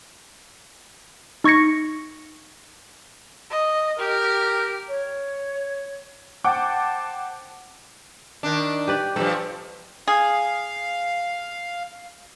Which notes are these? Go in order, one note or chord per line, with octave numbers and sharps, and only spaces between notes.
D#4 C#6 G#6 A#6 C#7
D#5
G4 A#4
C#5
C5 F#5 G5 A5 D6
D#3 D4
G4 B4 D5
G2 F3 A4 D5
G#4 F5